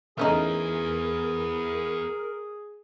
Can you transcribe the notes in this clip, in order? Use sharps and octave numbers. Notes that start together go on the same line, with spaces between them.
E3 A3 B3 C#4 D#4 G#4 A#4